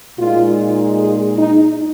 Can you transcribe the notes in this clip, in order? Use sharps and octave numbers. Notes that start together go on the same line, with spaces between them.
A#2 G#3 D#4 F4
G#4
D#4